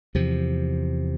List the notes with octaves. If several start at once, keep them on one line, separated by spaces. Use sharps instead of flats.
E2 C3 F3